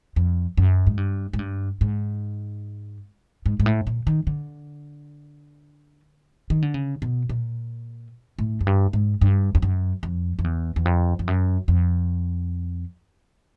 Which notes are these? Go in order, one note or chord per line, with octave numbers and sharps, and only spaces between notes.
F2
F#2
G#2
G2
G#2
G2
G#2
G#2
G#2
A2
A#2
D#3
D3
D#3
D3
C#3
B2
A#2
A2
F#2
G2
G#2
G2
F2
F#2
F2
F2
E2
E2
F2
F2
F#2
F2